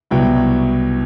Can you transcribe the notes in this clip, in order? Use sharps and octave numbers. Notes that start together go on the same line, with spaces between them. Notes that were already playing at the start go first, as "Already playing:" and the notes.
C2 B2 F#3 B3 E4 G5